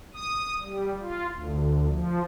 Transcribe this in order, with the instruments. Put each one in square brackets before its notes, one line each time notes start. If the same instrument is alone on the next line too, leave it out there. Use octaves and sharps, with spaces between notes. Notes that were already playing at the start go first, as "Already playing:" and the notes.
[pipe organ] D#6
G3
F4
D2
F3